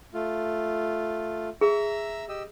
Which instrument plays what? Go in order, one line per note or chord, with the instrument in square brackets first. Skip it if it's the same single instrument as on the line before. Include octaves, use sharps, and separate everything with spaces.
[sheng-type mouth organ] A3 F4
[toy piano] G#4 [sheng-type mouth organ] E5 A#5 E6
[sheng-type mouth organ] G4 D#5 E6